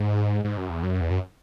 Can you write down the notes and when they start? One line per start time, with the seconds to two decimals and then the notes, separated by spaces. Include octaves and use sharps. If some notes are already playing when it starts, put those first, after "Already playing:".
Already playing: G#2
0.45 G#2
0.57 F#2
0.70 E2
0.83 F#2
1.01 E2
1.10 F#2